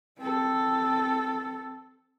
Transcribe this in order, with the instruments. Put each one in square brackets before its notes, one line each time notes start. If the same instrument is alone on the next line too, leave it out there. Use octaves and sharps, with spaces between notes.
[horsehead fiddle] C4 A4